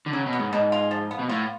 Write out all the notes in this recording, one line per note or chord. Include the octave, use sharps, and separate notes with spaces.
D3
C#3 F#3
B2
B3
G#2
G#2 B2
F4
F3
B3
B2
A2 F4